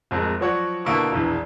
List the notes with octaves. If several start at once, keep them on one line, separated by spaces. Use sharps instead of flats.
D1 F2 G#3 A#4
F3 F#3 F#4 C#5 D5 F#5
B2 D3 A#3 E4 C#6
E1 A#1 E3